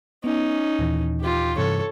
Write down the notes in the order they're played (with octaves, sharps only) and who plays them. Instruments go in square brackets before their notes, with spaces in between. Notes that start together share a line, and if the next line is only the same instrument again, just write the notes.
[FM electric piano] B3 [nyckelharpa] C#4 D#4
[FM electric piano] D#2 A#2 E3
[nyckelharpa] F4 G4
[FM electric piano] G2 C3 E3 [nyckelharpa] A4 C#5